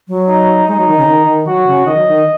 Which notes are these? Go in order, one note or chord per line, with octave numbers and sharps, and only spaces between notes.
F#3
D#4
G#3 D#4
F#3
D#3
C#3
D#3
D#3
F#3 F#4
C#3
D#3 D#5
F#3
D#3